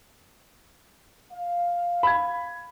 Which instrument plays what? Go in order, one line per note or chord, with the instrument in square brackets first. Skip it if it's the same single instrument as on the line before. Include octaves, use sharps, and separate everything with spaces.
[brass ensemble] F5
[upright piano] B5 G#6